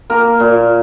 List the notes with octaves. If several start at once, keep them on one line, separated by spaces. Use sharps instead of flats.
A#3 A#4
A#2